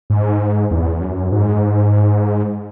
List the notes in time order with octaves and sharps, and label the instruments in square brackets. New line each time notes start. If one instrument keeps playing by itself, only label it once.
[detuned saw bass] G#2
E2
F#2
G#2